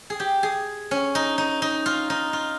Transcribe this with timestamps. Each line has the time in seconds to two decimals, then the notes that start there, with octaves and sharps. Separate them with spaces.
0.10 G#4
0.20 G4
0.43 G#4
0.91 C#4
1.15 D#4
1.38 D#4
1.62 D#4
1.86 F4
2.10 D#4
2.33 F4